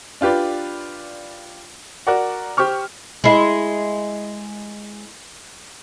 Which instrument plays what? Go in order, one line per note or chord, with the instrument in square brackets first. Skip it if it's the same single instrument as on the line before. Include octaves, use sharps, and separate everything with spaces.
[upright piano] D4 F4 G4 B4 D5
F#4 A#4 D5 F#5
G4 C5 C#6 F6
[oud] G#3 E4